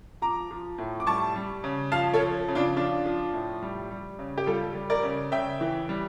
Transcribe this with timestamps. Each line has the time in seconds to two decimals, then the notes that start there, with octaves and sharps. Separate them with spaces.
0.22 F3 A#5 D6
0.51 F3
0.78 A2
1.00 D6
1.07 G3 A5 C#6
1.36 G3
1.64 C#3
1.92 F3 F5 A5
2.14 A4 C#5
2.21 F3
2.48 C#3
2.55 D4 F4
2.76 F3 D4 F4
3.06 F3
3.33 A2
3.63 G3
3.91 G3
4.19 C#3
4.38 G4
4.46 G3 F4 A4
4.75 G3
4.90 A#4 D5
5.03 C#3
5.32 C#3 E5 G5
5.61 E3
5.89 G3